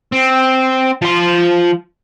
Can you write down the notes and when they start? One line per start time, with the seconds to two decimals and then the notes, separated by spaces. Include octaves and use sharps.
0.12 C4
1.02 F3 C6